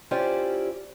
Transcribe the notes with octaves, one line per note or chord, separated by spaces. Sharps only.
C#4 E4 F4 G4 C5 D5